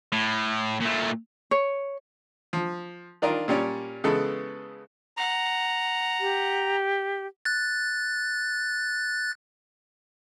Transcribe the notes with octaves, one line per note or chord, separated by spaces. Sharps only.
A2
A#2 A3
C#5
F3
D#3 D4 F4 A#4
A#2 G3 C#4 D5
C#3 E3 G#3 B3 A4
F#5 A#5
G4
F#6 A6